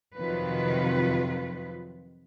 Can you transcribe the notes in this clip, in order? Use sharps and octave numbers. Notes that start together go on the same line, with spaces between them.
F2 C3 D#3 F#3 F4 B4